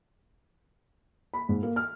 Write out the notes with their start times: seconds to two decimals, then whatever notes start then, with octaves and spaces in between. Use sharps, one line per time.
1.34 B5
1.49 G#2
1.63 A#3
1.76 F6